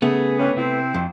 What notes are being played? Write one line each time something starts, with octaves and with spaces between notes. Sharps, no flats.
C#3 A3 B3 G#4
G2 E3 C#4
C3 C4 E4
F2